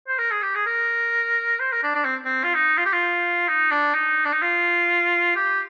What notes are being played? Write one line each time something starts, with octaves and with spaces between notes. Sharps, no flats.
C5
A#4
G#4
G4
G#4
A#4
C5
A#4
D4
D4
C4
C4
F4
D#4
F4
G4
F4
D#4
D4
D#4
D4
D#4
F4
G4